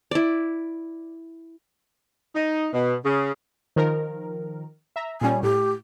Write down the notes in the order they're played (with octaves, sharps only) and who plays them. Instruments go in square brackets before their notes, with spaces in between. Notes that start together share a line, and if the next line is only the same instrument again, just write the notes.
[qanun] E4 D5
[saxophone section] D#4
B2
C#3
[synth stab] D#3 F3 A#4
E5 A#5
[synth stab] A#2 G3 C#4 [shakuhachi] G#5
[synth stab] A2 [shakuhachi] G4